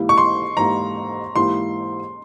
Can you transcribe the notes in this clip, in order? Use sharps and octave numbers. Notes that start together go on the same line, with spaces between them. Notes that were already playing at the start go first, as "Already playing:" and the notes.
Already playing: G#2 E3 A#3 E4 G4
C#6
C6
G#2 E3 A#3 E4 G4 A#5
G#2 E3 A#3 E4 G4 C6